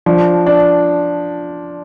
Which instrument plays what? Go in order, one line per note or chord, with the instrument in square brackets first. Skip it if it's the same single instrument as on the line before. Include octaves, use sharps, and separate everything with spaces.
[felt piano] F3 [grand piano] D4
[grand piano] D4